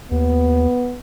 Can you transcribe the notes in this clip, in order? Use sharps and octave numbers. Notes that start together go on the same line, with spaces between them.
D#2 B3